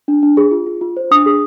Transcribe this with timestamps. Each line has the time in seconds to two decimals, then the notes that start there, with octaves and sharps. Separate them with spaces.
0.08 D4
0.23 D4
0.37 G#4
0.51 F4
0.66 F4
0.81 F4
0.97 C5
1.11 D4 D#6
1.26 G#4